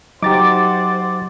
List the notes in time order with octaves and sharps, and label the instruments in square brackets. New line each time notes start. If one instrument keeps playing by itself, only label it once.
[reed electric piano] F#3 A#5 [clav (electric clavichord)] D#4 G4 [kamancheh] C5 F#5 [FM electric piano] D6 A6